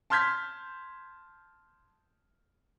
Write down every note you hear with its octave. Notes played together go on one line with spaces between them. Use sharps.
A5 C6 F6 G6 G#6 B6